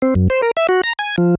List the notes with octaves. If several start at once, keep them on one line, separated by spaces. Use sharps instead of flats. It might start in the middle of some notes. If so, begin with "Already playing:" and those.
C4
F#2
C5
A#4
E5
F#4
A#5
G#5
F3